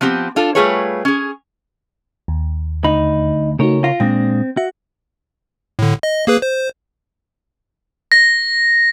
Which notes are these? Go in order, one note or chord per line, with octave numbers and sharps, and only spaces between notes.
F3 B3 C4 G4
D4 F4 A4
G3 A3 F4 G#4 B4 C#5
C#4 G#4
D#2
D2 D#4 B5
C#3 A3 D#4 F#4 A#4 C#5
F4 A#6
A#2 G#3 C4 D4
F#4 E5
A2 D3
D#5
A#3 G#4 B4
C5
A#6